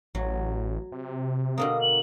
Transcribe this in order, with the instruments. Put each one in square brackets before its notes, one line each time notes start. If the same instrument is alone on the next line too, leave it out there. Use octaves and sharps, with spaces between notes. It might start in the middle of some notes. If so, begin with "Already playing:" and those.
[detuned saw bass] A1 [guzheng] F#3
[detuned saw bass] C3
[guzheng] B2 D3 A#3 [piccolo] D#6
[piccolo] F#7